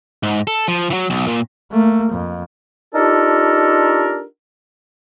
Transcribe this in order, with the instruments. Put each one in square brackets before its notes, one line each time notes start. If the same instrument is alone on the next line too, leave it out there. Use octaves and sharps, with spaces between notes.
[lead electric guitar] G#2
A4
F3
E3 F#3
B1
A#2
[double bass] A3 A#3
F2
[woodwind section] D4 D#4 F4 G4 A4 A#4